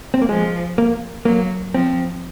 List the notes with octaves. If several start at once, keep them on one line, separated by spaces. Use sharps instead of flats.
C4
A#3
F3 G#3
A#3
F#3 A#3
F3 C4